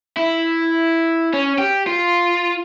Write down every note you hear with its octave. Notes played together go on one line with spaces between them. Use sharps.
E4
C#4
G4
F4